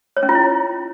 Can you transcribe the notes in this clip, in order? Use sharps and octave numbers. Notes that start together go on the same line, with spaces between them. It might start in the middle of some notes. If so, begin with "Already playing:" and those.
C#5
C#4
F4
E4